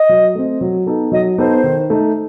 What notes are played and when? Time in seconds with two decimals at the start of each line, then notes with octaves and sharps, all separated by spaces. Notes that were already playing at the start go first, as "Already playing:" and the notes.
Already playing: D#5
0.09 F#3
0.35 A3 C4
0.61 F#3
0.86 B3 D#4 A4
1.12 F#3 D#5
1.38 B3 D#4 A4 C5
1.63 D#3
1.90 A3 D#4